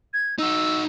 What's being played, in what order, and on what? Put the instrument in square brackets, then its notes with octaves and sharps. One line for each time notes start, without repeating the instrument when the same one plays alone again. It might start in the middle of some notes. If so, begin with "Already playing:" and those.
[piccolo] G#6
[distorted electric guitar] D#4 F#4 [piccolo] E6